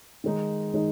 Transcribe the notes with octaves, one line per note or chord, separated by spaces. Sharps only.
D#3 G#3 D#4
D#3 G#3 D#4